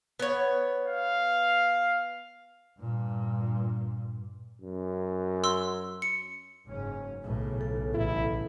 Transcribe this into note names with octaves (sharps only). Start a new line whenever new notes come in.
B3 C#5
F5
G2 A#2
F#2
C6 E6
C#7
F#1 G#2 C#4
B1 A2 C#3
A4
A1 E4